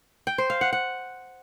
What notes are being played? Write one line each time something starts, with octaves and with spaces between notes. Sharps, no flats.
G5
C5
F5
F#5
F#5